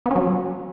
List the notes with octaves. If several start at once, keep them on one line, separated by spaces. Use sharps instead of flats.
B3
C#4
F#3